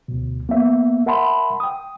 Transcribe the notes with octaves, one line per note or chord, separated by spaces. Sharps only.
D2 B2
A#3 B3 E5
A#4 E5 F#5 A5 B5 C6
G5 D#6